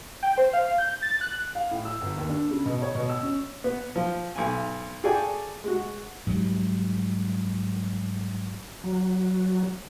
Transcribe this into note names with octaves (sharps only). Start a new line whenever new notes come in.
G5
C5
F5
G6
A6
F#6
F5
A2
E6
G1
D#2
D4
C#3
B2
C#5
B2
E6
C#4
B3
F3
B1 G#5
F#4 G#4 A4 D5 G5 G#5
G#3 F#4
G#2 F#3 G3
F#3